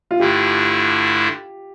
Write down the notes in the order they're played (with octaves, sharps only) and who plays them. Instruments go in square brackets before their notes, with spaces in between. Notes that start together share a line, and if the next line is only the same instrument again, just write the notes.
[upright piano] F4
[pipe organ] G2 D3 A3 E4 [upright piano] G4